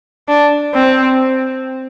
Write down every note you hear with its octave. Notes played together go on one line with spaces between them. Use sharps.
D4
C4